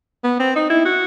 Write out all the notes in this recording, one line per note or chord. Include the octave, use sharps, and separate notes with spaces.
B3
C4
D#4
E4
F#4